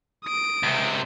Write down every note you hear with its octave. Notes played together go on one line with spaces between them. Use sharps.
D#6 D7
C#2 C3